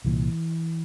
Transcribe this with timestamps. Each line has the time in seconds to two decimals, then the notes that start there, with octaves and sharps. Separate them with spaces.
0.05 C2 A#2 E3